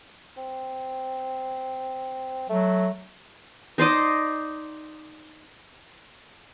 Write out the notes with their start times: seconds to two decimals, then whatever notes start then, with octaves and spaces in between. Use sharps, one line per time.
0.37 C4
2.49 F#3 A3
3.78 D#4 C5 D5 D#5